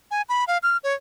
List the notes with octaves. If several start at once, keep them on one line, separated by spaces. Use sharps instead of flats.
G#5
B5
F5
F6
C#5